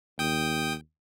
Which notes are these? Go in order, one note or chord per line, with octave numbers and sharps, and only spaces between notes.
D#2 G5 D#6